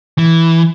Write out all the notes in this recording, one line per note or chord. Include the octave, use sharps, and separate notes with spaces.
E3